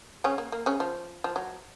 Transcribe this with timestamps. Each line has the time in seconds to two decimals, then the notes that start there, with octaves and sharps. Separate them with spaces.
0.24 C#3 C#4
0.38 A#3
0.52 A#3
0.66 C#3 C#4
0.80 F3
1.24 F3
1.36 F#3